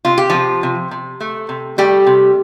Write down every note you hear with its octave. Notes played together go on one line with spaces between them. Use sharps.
C3 F4
G4
C3 F3 F4
C3
C3
A3
C3
G3 A3 G4
C3